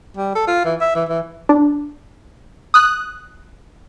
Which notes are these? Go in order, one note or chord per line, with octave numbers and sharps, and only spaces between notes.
G3
A4
F4
E3
E5
E3
E3
D4
D#6 F#6